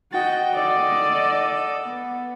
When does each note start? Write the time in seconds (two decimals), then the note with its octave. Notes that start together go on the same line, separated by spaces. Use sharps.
0.12 F#4 D#5 F#5 G5 A6
0.55 A4 D5 D#5
1.84 B3